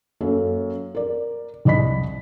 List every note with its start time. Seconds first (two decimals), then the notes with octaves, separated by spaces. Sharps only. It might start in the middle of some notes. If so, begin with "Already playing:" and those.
0.21 F#2 A#3 F#4 A4
0.95 A#4 D5
1.65 C2 D5 D#5 B5 B6